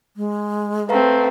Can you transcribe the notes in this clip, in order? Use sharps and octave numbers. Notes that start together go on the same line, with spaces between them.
G#3
A3 C4 B4 F5 A#5